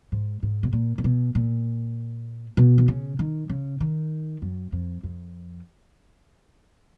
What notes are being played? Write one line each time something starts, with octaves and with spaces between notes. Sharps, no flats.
G#2
G#2
B2
A#2
A#2
B2
A#2
B2
D#3
C#3
D#3
C#3
D#3
F#2
F2
F2